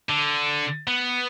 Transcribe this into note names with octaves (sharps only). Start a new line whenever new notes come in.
D3
B3